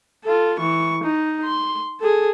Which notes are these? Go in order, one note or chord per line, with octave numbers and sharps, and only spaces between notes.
F4 A4
E3 C#6
D#4
C6
G#4 A4